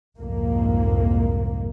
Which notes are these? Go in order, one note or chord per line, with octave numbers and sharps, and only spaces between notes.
C2 F2 G#2 A#3